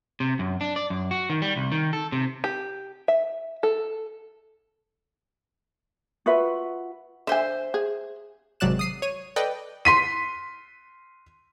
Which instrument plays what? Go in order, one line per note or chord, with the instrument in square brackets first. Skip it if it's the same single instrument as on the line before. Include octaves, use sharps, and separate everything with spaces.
[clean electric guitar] C3
F#2
D4
D5
F#2
F#4
D#3
G3
C2
D#3
A4
C3
[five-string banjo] G4
E5
A4
[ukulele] F4 F#4 B4 E5
[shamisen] D3 G#5 [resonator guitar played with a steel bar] C5 E5
[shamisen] G#4
[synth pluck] G#1 C3 F#3 D5 F#6 E7
D#6 C7 D#7
C#5 D#7
A4 B4 D5 D#5 G5
[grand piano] C6 B6 D#7